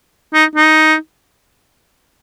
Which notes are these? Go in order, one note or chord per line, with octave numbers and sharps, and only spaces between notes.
D#4
D#4